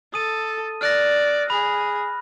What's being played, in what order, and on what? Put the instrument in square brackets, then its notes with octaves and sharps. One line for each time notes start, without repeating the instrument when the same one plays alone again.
[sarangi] A4 [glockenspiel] D#6 D#7
[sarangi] D5 [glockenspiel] F6 F#6 A#6
[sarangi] G#4 [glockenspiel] B5